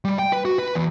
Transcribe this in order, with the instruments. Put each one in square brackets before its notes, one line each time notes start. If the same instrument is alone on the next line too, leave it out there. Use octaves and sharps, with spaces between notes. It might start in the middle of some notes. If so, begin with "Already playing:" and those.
[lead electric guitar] G3
G5
B4
F#4
B4
E2